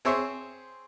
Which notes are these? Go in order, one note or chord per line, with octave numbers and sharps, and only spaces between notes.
C4 G#4 C5 C#5 E5